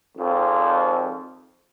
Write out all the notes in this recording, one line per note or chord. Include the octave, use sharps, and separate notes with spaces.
G#1 F2